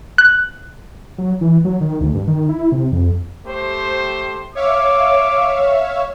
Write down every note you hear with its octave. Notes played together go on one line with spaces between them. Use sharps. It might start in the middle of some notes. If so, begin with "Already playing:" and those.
F#6
F#3
E3
F#3
D#3
D2
G2
D#3
E4
C3
F2
A3 G4 C5
C#5 E5 F5 D6